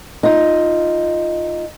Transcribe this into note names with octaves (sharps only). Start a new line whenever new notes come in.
D#4 F4